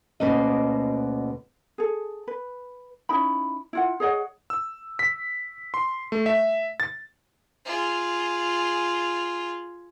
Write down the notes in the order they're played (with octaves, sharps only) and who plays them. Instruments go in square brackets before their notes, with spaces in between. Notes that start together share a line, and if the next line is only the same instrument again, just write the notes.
[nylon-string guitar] D2 B2 A#3 C#4 D#5
[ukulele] G#4 A4
B4
C#4 D#4 E4 B5
E4 F4 F#5
G#4 C#5 D#5 F#5
[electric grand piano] E6
B6
C6
A3
E5
A6
[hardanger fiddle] F4 G#4